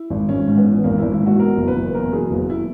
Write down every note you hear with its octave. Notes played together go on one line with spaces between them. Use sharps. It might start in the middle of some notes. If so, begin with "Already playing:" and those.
Already playing: E4
G#1
G#1 C#4
G#2
B3
E3
G#1 A#3
G#1 E4
E4
G#2
F#4
B2 A#4
F#1
B4
F#1
E2 A#4
B2 G#4
F#1
E4